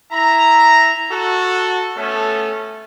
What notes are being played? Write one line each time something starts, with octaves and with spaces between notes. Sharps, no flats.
E4 E5 A#5
F#4 A4
A3 B3 C#4 A4